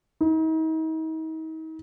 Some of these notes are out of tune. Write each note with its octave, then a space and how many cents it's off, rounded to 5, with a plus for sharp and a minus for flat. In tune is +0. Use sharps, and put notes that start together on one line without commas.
D#4 +40